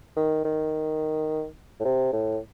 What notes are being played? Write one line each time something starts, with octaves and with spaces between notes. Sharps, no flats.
D#3
D#3
A2
C3
A2